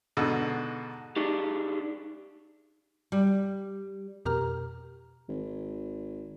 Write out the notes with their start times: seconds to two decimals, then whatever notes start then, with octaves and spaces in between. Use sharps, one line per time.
0.17 G#2 B2 D3
1.16 D4 D#4 G4 G#4
3.12 G3
4.25 F2 B2 G4 A#4 A#5 F6
5.29 G#1